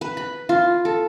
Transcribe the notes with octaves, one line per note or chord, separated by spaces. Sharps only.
B4
B5
F4
A4